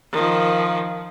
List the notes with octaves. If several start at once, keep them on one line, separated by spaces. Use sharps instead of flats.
D#3 F3